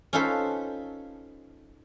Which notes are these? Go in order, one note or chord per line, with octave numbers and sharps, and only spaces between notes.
C#4 D#4 F4 A4 B4 C5